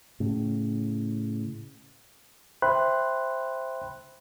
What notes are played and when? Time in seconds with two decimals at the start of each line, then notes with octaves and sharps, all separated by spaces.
0.20 A2 C#3
2.62 C5 E5 G5 B5 C6 F#6